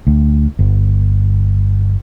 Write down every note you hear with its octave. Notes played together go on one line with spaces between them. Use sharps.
D2
G1